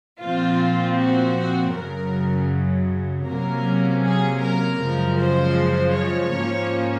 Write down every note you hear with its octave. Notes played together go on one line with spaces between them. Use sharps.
A#2 F3 C4 F4
F#4
F#2 C#3 F#3 A#4
C3 F#3 A#3 C#4 A#4
G#4
A#4
F#2 C#3 F3 G#3
C5
C#5
G#2 F3 A#3 C#4